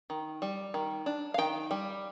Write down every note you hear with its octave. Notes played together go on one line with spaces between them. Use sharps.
D#3
G3
D#3
D4
F5
D#3 G5
G3